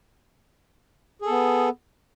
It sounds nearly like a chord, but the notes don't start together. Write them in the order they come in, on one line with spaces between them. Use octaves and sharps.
G#4 A4 B3